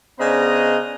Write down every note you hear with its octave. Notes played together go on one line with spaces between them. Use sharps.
C#3 B3 D4 C5 D#5 A#5